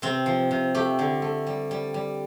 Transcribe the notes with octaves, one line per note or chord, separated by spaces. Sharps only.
C3 C4
F3
C3
A3 G4
D3
A3
G3
G3
G3